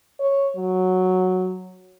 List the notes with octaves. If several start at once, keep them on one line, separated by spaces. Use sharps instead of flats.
C#5
F#3